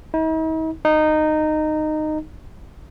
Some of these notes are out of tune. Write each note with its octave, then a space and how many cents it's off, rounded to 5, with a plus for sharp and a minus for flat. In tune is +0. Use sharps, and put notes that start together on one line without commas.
D#4 +45
D#4 -15